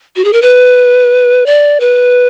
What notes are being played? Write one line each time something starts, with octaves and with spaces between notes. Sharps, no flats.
F#4
G#4
A#4
B4
D5
B4